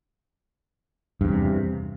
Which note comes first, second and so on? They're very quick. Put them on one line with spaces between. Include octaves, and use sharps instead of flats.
G2 E2 C3